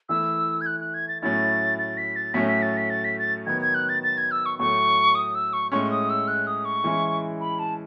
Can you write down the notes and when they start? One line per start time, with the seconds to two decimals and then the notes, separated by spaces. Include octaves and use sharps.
0.09 E3 A3 E4 E6
0.61 G#6
0.66 F#6
0.80 F#6
0.94 G#6
1.08 A6
1.22 A2 F#3 C#4 E4 A6
1.79 A6
1.97 B6
2.16 A6
2.34 A2 F#3 A3 C#4 B6
2.48 B6
2.62 A6
2.77 B6
2.90 A6
3.04 B6
3.19 A6
3.46 D#3 F#3 B3 G#6
3.61 G#6
3.74 F#6
3.89 A6
4.03 A6
4.18 G#6
4.31 E6
4.46 C#6
4.59 A2 F#3 A3 C#6
5.15 D#6
5.35 E6
5.53 C#6
5.72 A2 G#3 C#4 C#6
5.90 D#6
6.10 E6
6.28 F#6
6.47 D#6
6.65 C#6
6.84 E3 G#3 C#4 E4
7.40 B5
7.59 A5